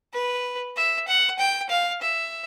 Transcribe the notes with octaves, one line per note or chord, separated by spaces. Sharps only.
B4
E5
F#5
G5
F5
E5